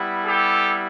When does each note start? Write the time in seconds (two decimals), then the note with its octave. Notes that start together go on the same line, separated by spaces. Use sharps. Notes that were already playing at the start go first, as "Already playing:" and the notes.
Already playing: G3 B3 E4
0.25 G4 A4